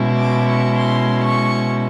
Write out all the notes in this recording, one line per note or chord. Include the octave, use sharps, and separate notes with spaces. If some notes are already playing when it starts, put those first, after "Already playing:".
Already playing: B2 G#3 C#4 E4
D6
C#6
C6
C#6